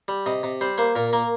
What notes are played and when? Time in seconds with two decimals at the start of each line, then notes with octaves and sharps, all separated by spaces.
0.08 G3
0.26 C3 D#5
0.43 C3
0.61 G3 C5
0.78 A#3 C5
0.96 A#2 A#4
1.13 A#3 A#4